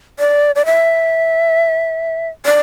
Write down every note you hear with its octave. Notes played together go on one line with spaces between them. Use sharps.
D5
D5
E5
D5